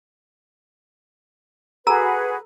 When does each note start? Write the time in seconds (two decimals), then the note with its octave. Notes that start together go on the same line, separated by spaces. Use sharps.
1.87 F#4 G#4 A4 B4 A#5 E6